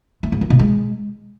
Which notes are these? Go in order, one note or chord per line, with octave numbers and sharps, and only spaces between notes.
A3
G#2
F#3
B2
G#3